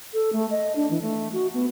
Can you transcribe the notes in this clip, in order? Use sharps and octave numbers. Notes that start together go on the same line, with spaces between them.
A4
A3
D#5
D4
E3
A3
F#4
B3